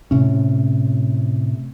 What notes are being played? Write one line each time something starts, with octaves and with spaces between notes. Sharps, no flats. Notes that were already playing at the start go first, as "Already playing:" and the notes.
A2 C3 C#4